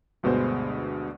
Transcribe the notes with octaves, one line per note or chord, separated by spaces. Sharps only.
D2 G2 B2 G#3 B3 C5